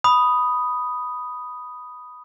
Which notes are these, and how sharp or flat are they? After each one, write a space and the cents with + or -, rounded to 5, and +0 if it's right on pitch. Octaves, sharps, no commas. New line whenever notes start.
B5 +0 D#6 +0